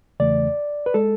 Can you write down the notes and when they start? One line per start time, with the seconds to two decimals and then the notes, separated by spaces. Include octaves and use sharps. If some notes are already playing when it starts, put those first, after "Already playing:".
0.20 E2 C#3 E3 A3 D5
0.86 B4
0.94 G#3 A4